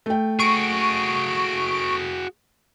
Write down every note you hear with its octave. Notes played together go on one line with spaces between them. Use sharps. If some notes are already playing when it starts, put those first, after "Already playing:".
A3 G5
F#4 G#4 C#6 D7